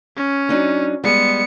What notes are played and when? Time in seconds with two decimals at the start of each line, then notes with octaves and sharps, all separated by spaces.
0.16 C#4
0.49 F#3 D4 D#4
1.04 G3 G#3 B3 G#4 C#7